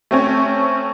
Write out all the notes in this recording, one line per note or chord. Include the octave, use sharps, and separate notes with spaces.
A3 C4 C#4